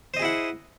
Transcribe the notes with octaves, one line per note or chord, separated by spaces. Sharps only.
E4 G#4 C5 D#5 F#5